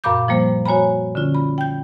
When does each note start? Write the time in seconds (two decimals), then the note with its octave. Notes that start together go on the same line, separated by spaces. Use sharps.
0.04 F#2 A#2 F5 B5 D6 G6
0.28 F3 G3 A#3 C5
0.66 F#4 C#5 G#5 A#5 B5
1.15 D3 C#4 F4
1.35 B5
1.58 G5 G6